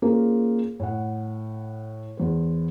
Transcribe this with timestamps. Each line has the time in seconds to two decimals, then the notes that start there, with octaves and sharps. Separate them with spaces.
0.02 A#3 C#4 F4 G#4 A#4 C5
0.80 A2 F#5
2.17 E2 C5